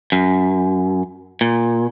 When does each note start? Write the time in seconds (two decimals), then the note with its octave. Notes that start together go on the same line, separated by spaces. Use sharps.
0.12 F#2
1.41 A#2